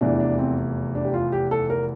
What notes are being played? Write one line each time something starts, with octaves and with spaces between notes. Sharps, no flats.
F1 E2 E3 D4
D4
C4
D4
G4
F4
G4
A4
A#4